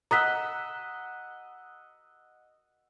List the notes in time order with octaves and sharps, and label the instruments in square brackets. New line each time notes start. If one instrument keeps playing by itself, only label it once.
[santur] D#5 F#5 E6 [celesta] A#5 D#6 B6